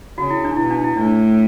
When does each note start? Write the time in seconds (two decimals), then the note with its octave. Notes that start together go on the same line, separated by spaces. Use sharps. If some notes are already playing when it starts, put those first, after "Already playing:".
0.18 C#3 F#4
0.30 E4
0.44 D4
0.57 B2 E4
0.70 D4
0.84 E4
0.97 A2 D4